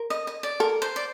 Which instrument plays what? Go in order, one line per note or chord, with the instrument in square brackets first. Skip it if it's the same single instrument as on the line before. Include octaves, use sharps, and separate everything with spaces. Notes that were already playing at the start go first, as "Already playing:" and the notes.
Already playing: [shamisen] A#4
[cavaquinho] D#5
D#5
D5
[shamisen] A4 [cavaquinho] A#4
[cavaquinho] C5
D5